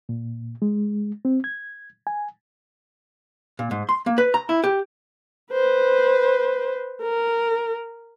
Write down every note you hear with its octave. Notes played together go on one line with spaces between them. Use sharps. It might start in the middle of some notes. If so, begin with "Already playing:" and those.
A#2
G#3
C4
G#6
G#5
A#2
G#2
C6
A#3
B4
A#5
E4
G4
B4 C5
A#4